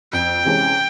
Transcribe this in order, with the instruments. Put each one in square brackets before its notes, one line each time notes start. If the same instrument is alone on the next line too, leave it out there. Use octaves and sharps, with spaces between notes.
[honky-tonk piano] F2 [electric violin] G5
[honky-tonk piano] C3 E3 G#3 C#4